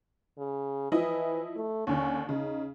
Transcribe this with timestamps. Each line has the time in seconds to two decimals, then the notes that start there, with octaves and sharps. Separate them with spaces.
0.38 C#3
0.92 E3 F3 E4 D#5
1.56 A3
1.87 D#2 D3 C#4
2.29 C#3 D#4